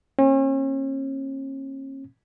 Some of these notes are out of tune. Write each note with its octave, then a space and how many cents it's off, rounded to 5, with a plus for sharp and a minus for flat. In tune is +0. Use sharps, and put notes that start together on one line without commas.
A#3 +0 C#4 -40